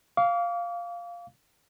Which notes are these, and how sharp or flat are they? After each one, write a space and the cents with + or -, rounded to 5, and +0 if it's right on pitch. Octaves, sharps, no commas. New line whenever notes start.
F5 +0 D6 -40